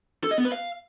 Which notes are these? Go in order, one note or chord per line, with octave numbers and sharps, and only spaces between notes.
A4
D#5
B3
B4
F5